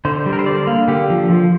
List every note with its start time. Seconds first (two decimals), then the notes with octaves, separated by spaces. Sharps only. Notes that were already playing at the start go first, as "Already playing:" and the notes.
0.05 D3 C5
0.26 G3
0.33 A#4
0.39 C5
0.46 D3 D5
0.67 A#3
0.88 D3 G4
1.10 F3
1.30 F3